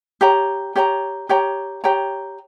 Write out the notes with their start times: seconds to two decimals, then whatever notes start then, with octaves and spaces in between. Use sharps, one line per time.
0.21 G4 C#5 G5 A#5
0.75 G4 C#5 G5 A#5
1.29 G4 C#5 G5 A#5
1.84 G4 C#5 G5 A#5